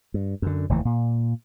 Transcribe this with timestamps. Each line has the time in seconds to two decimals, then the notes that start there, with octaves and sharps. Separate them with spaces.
0.14 G2
0.42 F#2 D3
0.69 F1 D#2 E3 A3
0.85 A#2